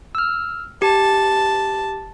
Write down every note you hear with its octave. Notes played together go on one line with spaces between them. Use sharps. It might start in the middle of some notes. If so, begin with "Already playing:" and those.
E6 F6
G4 A5